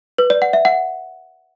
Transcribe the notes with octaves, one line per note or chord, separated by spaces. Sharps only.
B4
D5
F#5
E5
F#5